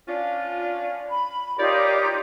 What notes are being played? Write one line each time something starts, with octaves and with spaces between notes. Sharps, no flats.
C#4 D4 F4
B5
D#4 F4 G4 A#4 C#5 D5